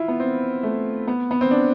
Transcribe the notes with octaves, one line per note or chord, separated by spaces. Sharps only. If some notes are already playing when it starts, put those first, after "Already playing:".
Already playing: E4 F4
B3
C4
A3
B3
B3
C4
D4